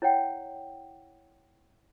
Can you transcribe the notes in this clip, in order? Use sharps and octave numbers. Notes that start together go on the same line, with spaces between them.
E4 C#5 D5 F#5 G5